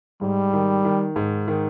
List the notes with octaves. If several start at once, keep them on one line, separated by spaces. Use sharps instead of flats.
G#2 G3
D#3
D#3
G#2
D#3